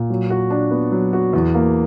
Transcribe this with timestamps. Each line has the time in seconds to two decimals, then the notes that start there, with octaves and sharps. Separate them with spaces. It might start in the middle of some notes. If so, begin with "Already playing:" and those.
Already playing: A#2
0.10 F#3
0.30 F#4
0.50 D4
0.71 B3
0.92 F#3
1.13 F#4
1.33 E2
1.54 A#3